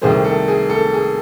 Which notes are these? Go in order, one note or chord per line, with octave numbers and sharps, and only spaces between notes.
C2 C3 D#3 A3 G#4 C5
A4
G#4
A4
G#4